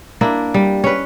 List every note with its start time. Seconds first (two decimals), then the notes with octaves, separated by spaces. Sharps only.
0.21 A#3 D4 E4
0.54 G3
0.84 C#4 B4